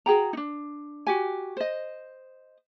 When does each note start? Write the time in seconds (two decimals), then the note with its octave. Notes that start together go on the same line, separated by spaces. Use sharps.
0.06 F#4 G#4 G5 A#5
0.33 D4 D#4
1.07 F#4 G4 G#5
1.57 C5 D#5